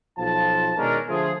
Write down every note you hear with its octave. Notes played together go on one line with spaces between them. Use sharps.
B1 F3 F4 A5
B2 D#3 G#3 C#4 D4 A#4
D3 F3 A3 F4 G#4